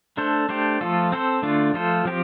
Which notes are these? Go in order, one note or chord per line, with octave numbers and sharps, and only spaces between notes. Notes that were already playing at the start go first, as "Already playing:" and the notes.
A3 D4 A4 C5
A3 D4 G4 C5
F3 A3 F4 A4
C4 A4 C5
D3 A3 D4 F4
F3 A3 F4 A4 C5
F3 C4 G4